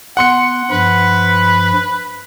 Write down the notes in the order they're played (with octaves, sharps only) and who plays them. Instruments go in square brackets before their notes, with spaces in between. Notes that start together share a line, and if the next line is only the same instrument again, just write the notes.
[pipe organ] B3 [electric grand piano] F#5 C6 C#7
[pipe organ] G2 F3 [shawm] B4 [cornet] B5